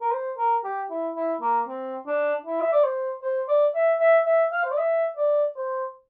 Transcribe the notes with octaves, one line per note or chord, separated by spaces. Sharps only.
A#4
C5
A#4
G4
E4
E4
A#3
C4
D4
E4
E5
D5
C5
C5
D5
E5
E5
E5
F5
C5
D5
E5
D5
C5